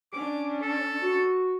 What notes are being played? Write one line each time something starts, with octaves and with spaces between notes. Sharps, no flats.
C#4 D4 D6
A4
F#4